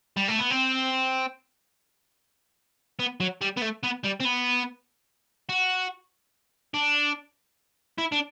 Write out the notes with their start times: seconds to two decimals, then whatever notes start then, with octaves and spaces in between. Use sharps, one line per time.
0.17 G3
0.28 A3
0.39 B3
0.50 C4
2.99 B3
3.20 F#3
3.41 G3
3.57 B3
3.61 A3
3.83 B3
4.04 G3
4.20 C4
4.25 B3
5.49 F#4
6.74 D4
7.98 E4
8.12 D4